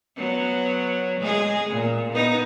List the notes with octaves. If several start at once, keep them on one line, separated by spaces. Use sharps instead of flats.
F#3 B3
G#3 G#4
A#2
B3 D#4